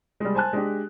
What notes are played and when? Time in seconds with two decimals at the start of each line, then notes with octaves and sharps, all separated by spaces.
0.20 G3 G#3
0.35 C5 G#5 A5 F#6
0.53 G#3 D4 G4